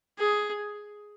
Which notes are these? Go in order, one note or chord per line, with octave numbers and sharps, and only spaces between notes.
G#4